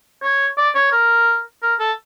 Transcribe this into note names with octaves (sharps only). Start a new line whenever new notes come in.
C#5
D5
C#5
A#4
A#4
A4